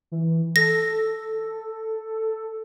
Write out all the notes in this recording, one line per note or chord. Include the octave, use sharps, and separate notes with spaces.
E3
A4 A#6